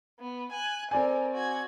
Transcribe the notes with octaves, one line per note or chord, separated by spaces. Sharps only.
B3
G#5 F#6
C4 A4 A#4 D5 G#5
F#4 G#6